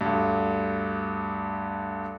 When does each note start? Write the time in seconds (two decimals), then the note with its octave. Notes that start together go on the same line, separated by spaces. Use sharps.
0.01 D2 G2